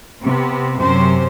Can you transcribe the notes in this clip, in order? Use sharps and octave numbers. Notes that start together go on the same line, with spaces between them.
C3 B3 C4
F#2 C3 F#3 C#4 C5